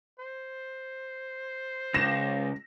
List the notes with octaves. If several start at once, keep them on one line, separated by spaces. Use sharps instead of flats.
C5
C#2 A#6 E7